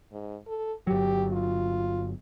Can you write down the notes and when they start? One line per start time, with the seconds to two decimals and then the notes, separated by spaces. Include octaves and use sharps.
0.12 G#2
0.47 A4
0.87 G1 F#3 G4
1.33 F4